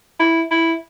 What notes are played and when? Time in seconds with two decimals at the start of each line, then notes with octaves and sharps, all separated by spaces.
0.19 E4
0.51 E4